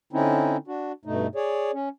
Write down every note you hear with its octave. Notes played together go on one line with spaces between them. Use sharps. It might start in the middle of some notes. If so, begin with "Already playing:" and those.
D3 C4 C#4 D#4 E4
D4 F#4
G2 B2 A3 D#4
G#4 C#5 D5
C#4